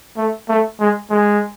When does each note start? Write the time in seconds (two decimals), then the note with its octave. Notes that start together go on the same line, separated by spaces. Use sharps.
0.17 A3
0.48 A3
0.80 G#3
1.10 G#3